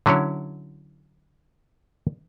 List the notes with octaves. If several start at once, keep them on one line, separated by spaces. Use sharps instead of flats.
D3 F#3 C#4 E4 C#5